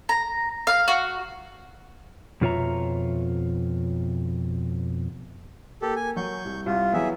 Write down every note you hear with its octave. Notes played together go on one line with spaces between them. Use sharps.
A#5
F5
F#4
F2 B2 F4 C#5 E5 A#5
A#3 G4 A4
G#5
F#3 C#6 G6
C2
C2 F4
E3 F#3 B3 G#4 E5